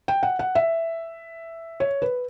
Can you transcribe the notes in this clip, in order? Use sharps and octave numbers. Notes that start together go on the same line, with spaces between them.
G5
F#5
F#5
E5
C#5
B4